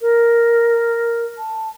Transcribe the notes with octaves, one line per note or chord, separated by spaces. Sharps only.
A#4
A5